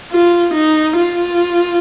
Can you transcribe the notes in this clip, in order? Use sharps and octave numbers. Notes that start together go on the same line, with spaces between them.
F4
D#4
F4